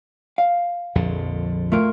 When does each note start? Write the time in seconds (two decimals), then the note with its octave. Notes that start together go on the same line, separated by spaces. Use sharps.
0.38 F5
0.95 A#1 F2 D3
1.72 A3 F4 A#4